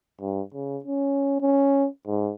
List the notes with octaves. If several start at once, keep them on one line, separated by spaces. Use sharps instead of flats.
G2
C#3
C#4
C#4
G#2